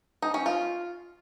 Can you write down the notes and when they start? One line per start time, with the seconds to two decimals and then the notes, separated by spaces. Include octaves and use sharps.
0.22 D#4
0.34 C#4
0.46 F4